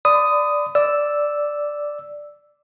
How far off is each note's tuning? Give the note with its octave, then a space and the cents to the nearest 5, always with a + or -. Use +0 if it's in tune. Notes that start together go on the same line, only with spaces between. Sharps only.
D5 +0 B5 +40 D#6 +0
D5 +0 E6 +0